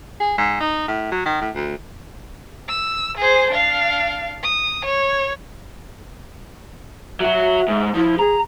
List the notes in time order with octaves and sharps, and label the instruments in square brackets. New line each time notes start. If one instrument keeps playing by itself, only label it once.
[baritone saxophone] G#4
G#2
D#4
A2
F#3
D#3
A2
D2
[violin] E6
G#4 C5
D4 F5
D#6
C#5
[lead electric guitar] F#3 F#4 [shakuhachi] E5
[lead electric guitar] G#2
[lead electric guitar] F3 [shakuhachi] E4
[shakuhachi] G#4 [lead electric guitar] A#5